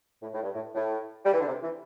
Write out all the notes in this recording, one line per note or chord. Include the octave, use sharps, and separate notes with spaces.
A2
A2
G2
A2
A2
G3
E3
D3
C3
E3